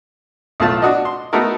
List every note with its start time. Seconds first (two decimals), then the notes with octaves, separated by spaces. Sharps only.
0.60 B1 A2 A3 F4 A5
0.82 D4 F#4 D#5
1.05 C6
1.33 A3 B3 D#4 F#4 A4 A#4